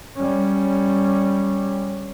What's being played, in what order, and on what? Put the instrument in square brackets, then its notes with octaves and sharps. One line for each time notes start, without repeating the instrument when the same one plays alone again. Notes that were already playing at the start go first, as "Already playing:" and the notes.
[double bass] G3 C#4